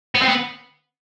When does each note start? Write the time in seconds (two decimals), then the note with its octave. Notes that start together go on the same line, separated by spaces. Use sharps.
0.15 B3
0.22 C4
0.29 B3